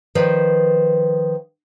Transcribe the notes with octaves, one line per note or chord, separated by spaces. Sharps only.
D#3 F3 B4 D5